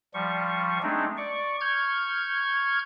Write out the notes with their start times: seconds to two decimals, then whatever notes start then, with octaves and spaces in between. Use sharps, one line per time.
0.14 F3 G3 C#6
0.83 G#3 A3 C4 D4 D#4
1.17 D5 C#6
1.61 C#6 F6 G6 G#6